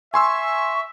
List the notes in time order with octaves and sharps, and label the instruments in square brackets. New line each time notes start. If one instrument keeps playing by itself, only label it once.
[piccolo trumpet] E5 [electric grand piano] G#5 C6 E6 [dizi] C#6